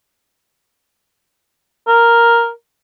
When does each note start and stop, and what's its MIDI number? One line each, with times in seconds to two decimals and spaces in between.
1.87 2.49 70